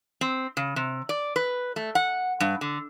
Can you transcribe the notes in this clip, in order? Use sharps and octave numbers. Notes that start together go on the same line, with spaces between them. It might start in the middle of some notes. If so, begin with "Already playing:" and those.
C4
C#3
C3
D5
B4
A3
F#5
G2
D3